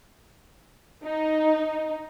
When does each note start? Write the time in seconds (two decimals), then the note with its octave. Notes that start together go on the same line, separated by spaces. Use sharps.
1.04 D#4